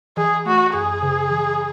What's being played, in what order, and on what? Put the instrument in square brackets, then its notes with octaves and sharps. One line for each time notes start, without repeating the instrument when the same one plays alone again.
[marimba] E3 [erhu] G#4
[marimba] A3 [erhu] F#4
[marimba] F#2 [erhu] G#4
[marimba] C#3
E3